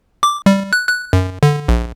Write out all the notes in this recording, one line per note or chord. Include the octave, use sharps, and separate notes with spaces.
D6
G3
F#6
F#6
F#2
D3
A#1